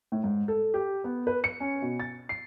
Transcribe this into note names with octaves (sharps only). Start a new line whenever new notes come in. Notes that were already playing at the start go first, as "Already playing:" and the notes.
A2
G#2
A4
G4
B3
B4
C#7
C#4
B2
A6
C7